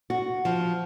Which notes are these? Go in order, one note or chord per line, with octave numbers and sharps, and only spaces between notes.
F#4
F3